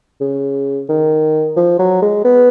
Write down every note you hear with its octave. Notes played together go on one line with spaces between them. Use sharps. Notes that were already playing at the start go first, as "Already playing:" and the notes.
C#3
D#3
F3
F#3
G#3
B3